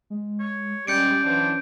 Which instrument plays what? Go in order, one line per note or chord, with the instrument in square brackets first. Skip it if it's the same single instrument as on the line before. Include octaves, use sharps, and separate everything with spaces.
[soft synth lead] G#3
[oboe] C#5
[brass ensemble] G3 G#3 [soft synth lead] C#4 [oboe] D5 [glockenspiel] G6 C#7 D7
[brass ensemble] E3 F#3 D4 [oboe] C5